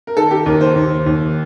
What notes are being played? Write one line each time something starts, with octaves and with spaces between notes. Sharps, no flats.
A#4
D#3 A4
G4
D#2 A#4
C5
D#2
D#2